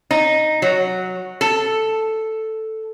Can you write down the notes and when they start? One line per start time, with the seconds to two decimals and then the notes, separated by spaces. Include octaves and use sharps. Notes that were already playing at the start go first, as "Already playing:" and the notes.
0.11 D#4
0.62 F#3
1.41 A4